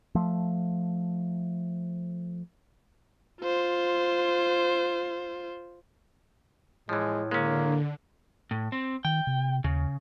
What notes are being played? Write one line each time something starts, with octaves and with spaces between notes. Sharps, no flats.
F3 A3
F4 C5
A2 E3 F3 G#3
D3 G#3 A#3 C#4
A2
C4
D#3 G5
C3
D#2 C#3